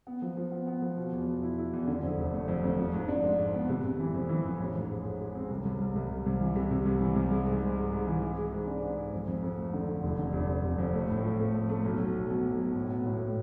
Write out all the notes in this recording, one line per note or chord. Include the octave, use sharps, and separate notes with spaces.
B3
F3
F3
B3
B3
F3
B2
E2
E2
E4
E4
E2
D3
F2
F1
A3
F2
F2
F3
G#2
D4
G#2
G#2
B3
C3
C3
E3
F2
E3
F2
A1
G#2
G#3
G#2
G#3
C4
C2
C2
C2
C2
C2
C2
E3
C3
C3
C2
E3
C2
G#3
G#2
G#2
G#3
G#2
E3
G#3
G#3
G#2
D4
G#2
G#2
F2
F2
F2
A3
D3
D3
F1
D3
F1
F1
F1
F2
A3
A2
F3
A3
A3
A3
B1
B2
B1
B2
B1
B2
A2
B3
A2
A2